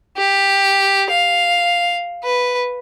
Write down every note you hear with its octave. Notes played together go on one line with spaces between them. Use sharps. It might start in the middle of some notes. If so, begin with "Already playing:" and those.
G4
F5
B4